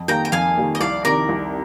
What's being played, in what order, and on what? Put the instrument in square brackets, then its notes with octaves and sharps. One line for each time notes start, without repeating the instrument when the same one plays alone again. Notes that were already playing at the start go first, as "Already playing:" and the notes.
Already playing: [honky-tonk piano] F2
[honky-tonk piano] D#3 G3 A#3 [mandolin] G5 A#5
[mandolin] G5
[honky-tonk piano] F2 [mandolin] F5 G#5
[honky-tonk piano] D#3 G3 A#3
[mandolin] D#5
[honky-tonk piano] C2 [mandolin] D5 F5
[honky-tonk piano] C3 D#3 [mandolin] A#4 D5
[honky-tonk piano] C2